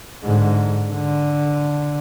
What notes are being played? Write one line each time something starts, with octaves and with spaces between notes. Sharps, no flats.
G#2 D3
D3